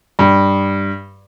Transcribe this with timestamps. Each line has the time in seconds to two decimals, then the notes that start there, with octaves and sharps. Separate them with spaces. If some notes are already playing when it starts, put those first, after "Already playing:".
0.19 G2